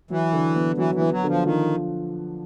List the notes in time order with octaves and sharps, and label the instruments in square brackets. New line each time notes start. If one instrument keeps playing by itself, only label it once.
[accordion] E3 [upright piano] F#3
[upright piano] D3
B3
[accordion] E3 [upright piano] F#3
[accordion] E3
[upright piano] B3
[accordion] F#3
[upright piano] D3
[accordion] F3
[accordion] D#3 [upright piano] F3